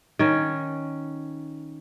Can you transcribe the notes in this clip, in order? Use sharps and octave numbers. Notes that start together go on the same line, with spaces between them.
D#3 C#4